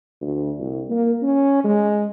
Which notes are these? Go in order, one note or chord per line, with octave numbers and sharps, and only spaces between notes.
D2
C2
A#3
C#4
G#3